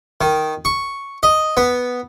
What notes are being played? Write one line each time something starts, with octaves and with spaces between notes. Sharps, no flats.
D#3
C#6
D#5
B3